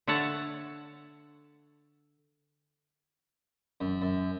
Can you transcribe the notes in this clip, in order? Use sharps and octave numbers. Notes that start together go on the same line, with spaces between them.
D3 C#5 E5 F#5 A5
F#2
F#2